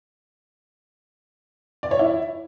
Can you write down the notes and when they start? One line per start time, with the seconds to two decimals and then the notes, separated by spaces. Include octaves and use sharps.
1.83 D5
1.91 C#5
1.99 E4